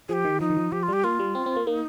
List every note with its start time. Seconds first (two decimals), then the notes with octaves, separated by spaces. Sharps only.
0.09 F3 G4 G#4
0.25 D#3
0.40 F3 D#4
0.50 D#3
0.57 F3
0.72 F3 G4
0.83 F4
0.88 G3 G4
1.04 A#3 F4
1.20 G3
1.35 C4
1.46 C4
1.56 A#3
1.67 A#3 D#4